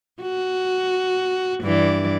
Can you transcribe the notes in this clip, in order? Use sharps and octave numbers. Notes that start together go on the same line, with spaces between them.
F#4
G2 E3 D5